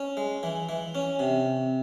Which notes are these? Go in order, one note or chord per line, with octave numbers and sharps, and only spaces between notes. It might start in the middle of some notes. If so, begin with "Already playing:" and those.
Already playing: C#4
G#3
E3
E3
C#4
C3